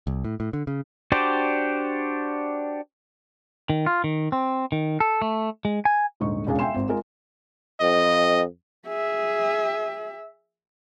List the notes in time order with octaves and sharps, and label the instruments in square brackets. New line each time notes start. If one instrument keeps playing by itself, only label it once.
[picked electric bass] C2
A2
A2
D3
C#3
[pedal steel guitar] D4 F#4 G4 C5 D5
[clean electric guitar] D#3
F4
D#3
C4
D#3
A4
A3
G#3
G#5
[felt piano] D#1 G#2 D3 D#4 C#6
E1 C#2 C#4 D4 G#4 F5
E5 F5 G5 G#5 C6 E7
G#1 C4
G#3 F4 A#4
[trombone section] F2 [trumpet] D#5
[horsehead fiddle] G#4 E5